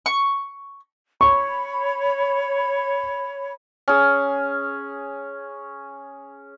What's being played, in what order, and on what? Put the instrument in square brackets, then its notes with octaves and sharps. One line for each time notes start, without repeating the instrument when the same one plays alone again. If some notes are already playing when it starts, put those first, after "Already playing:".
[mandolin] C#6
[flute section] C#5 B5 [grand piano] C#6
[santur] C#4 G#4